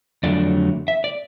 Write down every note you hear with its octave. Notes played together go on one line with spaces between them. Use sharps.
F2 D3 F#3 A3 D5
E5
D5